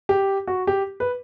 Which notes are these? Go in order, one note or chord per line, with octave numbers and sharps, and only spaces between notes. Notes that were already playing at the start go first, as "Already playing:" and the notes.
G4
F#4
G4
B4